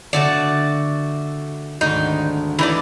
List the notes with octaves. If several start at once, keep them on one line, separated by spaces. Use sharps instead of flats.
D3 A3 F#4 D5
G#1 D2 D#4
E3 D#4 D5